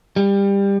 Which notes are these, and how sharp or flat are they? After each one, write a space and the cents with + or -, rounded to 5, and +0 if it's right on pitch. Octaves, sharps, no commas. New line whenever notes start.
G3 +20